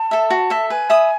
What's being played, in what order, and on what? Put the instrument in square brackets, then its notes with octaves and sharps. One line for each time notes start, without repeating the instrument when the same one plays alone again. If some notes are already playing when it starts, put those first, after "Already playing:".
Already playing: [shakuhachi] A5
[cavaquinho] A4 E5
F#4
A4 E5
[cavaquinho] B4 [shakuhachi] G#5
[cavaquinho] E5 B5 D#6